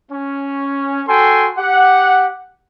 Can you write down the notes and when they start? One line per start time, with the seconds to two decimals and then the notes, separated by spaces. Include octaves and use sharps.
0.11 C#4
1.07 F#4 A4 G5 G#5 C6
1.58 G4 F#5